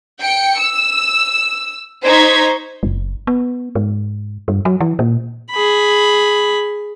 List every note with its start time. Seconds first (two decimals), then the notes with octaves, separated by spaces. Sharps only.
0.23 G5 C#7
0.60 E6
2.06 D#4 C5 C#6 G#6 B6
2.83 F#1
3.27 B3
3.75 G#2
4.48 G2
4.65 F#3
4.81 E3
4.99 A#2
5.51 G#4 B5